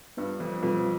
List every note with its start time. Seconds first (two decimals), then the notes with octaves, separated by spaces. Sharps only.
0.17 G2 B3 D4 F4 B4
0.40 F2
0.62 F2 B2 G3 C4 F4 B4